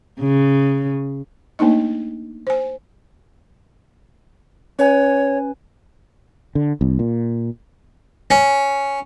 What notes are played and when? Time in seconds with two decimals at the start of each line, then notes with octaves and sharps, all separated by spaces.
0.20 C#3
1.59 A3 A#3 D4 D#4 D#5
2.47 C5 G#5
4.79 C#4 B4 C#5 G#5
6.55 D3
6.81 C2
6.99 A#2
8.31 C#4